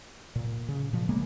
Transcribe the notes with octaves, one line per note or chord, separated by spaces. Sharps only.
A#2
C#3
A#2 F3
C#3 G#3 A#3 B3